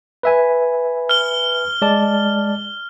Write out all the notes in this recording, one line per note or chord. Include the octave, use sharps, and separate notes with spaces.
B4 E5 G#5
F6 G7
G#3 D5 A5